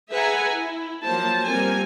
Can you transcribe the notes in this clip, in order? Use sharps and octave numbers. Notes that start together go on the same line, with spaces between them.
G#4 B4 E5 F#5 G#5 A#5
E4
F3 F#3 A#3 C5 A5
F3 G3 A#3 C4 A#4 G#5